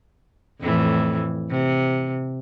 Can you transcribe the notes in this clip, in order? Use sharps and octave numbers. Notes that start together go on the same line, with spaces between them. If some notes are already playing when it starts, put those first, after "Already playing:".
F2 A2 E3
C3